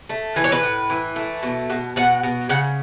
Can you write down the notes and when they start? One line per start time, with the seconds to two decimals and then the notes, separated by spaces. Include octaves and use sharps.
0.09 A3
0.36 E3 B4
0.44 C#5
0.52 B4
0.63 A2
0.90 E3
1.16 A3
1.43 B2
1.70 B2
1.96 B2 F#5
2.23 B2
2.49 C#3 F#5